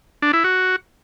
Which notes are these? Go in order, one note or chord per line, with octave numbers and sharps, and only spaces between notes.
D4
E4
F#4